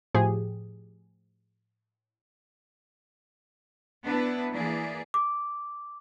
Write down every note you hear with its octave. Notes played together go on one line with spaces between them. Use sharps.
A2 F3 G4 G#4
B3 D4 E4 B4
E3 A#3 G#4 D5
D6